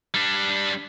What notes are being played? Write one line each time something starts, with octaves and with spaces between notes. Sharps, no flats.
G3 D4